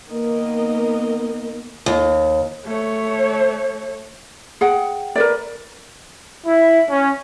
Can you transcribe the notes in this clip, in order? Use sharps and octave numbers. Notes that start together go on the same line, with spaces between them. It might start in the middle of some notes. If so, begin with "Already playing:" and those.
D#3 A#3 B3 A#4 D#5
D#2
A3 C#5
G#4 F#5 G5
A#4 B4 D5
E4
C#4